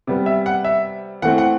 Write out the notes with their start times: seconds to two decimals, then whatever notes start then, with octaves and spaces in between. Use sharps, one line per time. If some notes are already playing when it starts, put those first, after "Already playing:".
0.07 C3 G3 B3
0.26 E5
0.46 F#5
0.64 E5
1.22 E3 A3 C4 F#5
1.38 F#5